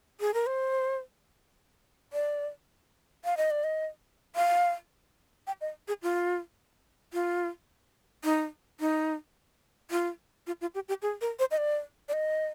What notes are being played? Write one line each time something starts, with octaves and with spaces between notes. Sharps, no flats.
G#4
A#4
C5
D5
F5
D#5
D5
D#5
F5
G5
D#5
G#4
F4
F4
D#4
D#4
F4
F4
F4
G4
G4
G#4
A#4
C5
D#5
D5
D5
D#5